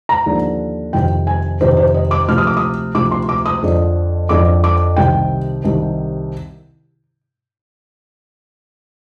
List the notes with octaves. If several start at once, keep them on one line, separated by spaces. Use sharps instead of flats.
A#5
D#2 D3 F3
F2 C3 D#3 G5
G#5
F2 C3 D#3 C5
C5
D#5
D6
D2 C3 F3 F6
D#6
D6
D#6
D2 C3 F3 D6
C6
D6
D#6
F2 D3 F3
F2 D3 F3 D6
D6
C2 C3 D#3 G5
C2 C3 D#3